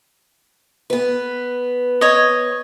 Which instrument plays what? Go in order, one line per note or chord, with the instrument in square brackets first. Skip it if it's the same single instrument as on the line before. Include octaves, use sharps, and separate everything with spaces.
[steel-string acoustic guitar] B3 B4
[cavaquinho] C#5 D#5